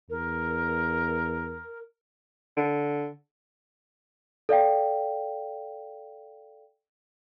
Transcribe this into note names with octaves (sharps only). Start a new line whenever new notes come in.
E2 A#4
D3
A4 D5 F5 G5